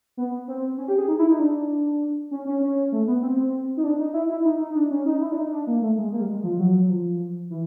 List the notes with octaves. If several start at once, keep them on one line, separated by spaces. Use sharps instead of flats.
B3
C4
C#4
G4
G#4
D#4
E4
D#4
D4
C#4
C#4
C#4
A3
B3
C4
D#4
D4
D#4
E4
E4
D#4
D#4
D4
C#4
D#4
E4
D4
D#4
D4
A#3
A3
G#3
A#3
G3
G#3
F3
F#3
F3
E3